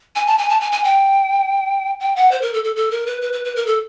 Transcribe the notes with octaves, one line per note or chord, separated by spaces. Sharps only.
G#5
A5
G#5
A5
G#5
G#5
G5
G5
F#5
C5
A#4
A4
A4
A4
A#4
B4
B4
B4
B4
A#4
A4